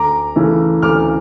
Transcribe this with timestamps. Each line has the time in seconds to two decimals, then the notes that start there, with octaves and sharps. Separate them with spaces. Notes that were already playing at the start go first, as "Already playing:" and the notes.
Already playing: D2 A#5 D6
0.36 C#3 E3 A3 C#4
0.82 D2 D6 F6